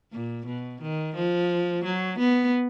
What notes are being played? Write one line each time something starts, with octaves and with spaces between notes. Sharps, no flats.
A#2
B2
D#3
F3
F#3
B3